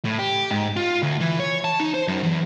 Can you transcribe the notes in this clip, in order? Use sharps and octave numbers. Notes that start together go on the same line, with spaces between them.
A2
G4
G#2
F4
D2
E3
C#5
A5
D#4
C5
F#2
E2